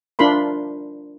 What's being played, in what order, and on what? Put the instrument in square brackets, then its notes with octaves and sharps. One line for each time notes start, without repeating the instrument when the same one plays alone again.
[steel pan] D4 F4 A#4 B5 C6